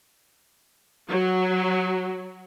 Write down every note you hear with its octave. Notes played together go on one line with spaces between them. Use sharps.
F#3